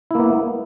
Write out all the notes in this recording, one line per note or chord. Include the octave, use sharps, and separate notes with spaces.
A#3 B3 E4